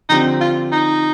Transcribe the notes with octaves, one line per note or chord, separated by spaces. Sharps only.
D3 F3 C4 D#4 G4
F4
D#4